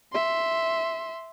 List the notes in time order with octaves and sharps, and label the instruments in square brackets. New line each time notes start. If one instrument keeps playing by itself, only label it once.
[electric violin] E5 C6